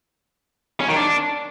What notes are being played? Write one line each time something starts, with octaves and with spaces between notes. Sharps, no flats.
C#4
D#3
D4